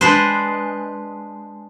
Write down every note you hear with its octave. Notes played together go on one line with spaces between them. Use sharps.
G#3 D4 B4 C5